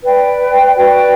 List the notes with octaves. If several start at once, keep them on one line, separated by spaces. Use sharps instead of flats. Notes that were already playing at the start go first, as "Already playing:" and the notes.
B4 D5 G5
F#4 B4 D5 G5